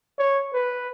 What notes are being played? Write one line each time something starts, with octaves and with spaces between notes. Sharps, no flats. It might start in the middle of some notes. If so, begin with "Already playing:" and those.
C#5
B4